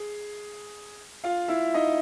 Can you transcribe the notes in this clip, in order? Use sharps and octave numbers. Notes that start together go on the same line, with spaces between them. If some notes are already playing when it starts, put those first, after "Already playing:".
Already playing: G#4
F4 F5
E4 E5
D#4 D#5